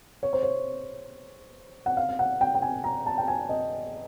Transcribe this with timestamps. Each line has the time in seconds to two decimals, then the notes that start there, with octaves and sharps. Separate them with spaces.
0.23 C#5
0.33 C5
0.43 C#5
1.86 F#5
1.97 F5
2.09 F5
2.19 F#5
2.41 G5
2.55 G5
2.62 G#5
2.84 A#5
3.06 A5
3.18 G5
3.28 G#5
3.49 D#5